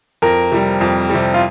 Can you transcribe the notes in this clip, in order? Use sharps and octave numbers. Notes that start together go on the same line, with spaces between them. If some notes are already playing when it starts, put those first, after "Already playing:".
F2 A#4
C3 G3
F2
C3 G3
F4